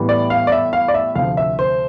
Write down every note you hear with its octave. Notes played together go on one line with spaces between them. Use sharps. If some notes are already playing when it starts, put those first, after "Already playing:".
Already playing: A2 E3 G3 B3
D5
F5
D5
E5
F5
D5
E5
D2 C3 F3 F5
E5
C5